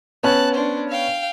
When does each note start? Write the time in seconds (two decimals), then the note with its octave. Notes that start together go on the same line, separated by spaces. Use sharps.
0.23 B3 C#4 A5 F#6
0.54 D4 C5
0.89 F5 G5